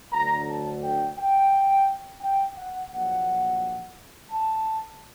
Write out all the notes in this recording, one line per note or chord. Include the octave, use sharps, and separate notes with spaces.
D2 D3 F#3 A#5
A5
G5
G5
G5
F#5
A#1 A#2 F#3 F#5
A5